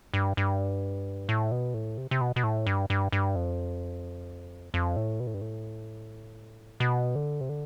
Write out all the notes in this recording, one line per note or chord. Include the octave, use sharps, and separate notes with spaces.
G2
G2
A2
B2
A2
C3
C3
B2
B2
A2
G2
G2
G2
F2
F2
A2
B2
A2
G2
A2
B2
D3
C3
D3